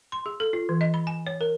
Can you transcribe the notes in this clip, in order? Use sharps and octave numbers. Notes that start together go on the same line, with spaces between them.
C6
G#4
A4
F4
E3
D#5
B5
G#5
C#5
A#4